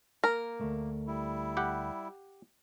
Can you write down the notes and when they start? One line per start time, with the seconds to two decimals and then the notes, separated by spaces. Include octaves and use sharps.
0.24 A#3 A#4
0.61 D2 A3
1.07 G3 E4
1.57 G4 F#5